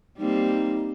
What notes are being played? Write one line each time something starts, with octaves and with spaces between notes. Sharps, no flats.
G3 A#3 C4 D#4